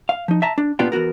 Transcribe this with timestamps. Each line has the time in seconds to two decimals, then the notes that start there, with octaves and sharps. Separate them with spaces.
0.09 F5
0.28 F3 D#4
0.42 E5 A5 A#5
0.58 D4
0.79 A#2 B3 D4 F4 G4
0.92 E2 B3 F#4 A#4